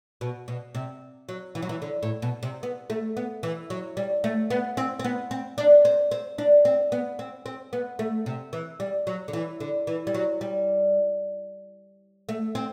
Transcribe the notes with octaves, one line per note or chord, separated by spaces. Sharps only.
B2
B2
C3
F#3
E3
F#3
E3
D3
A2
B2
C3
B3
A3
B3
E3
F#3
G3
A3
B3
C4
C4
B3
C4
D4
C4
C4
D4
C4
B3
C4
C4
B3
A3
C3
E3
G3
F#3
D3
E3
D3
E3
G3
F#3
G3
A3
C4